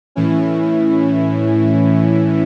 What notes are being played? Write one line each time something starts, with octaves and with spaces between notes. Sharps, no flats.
A2 E3 C#4 E4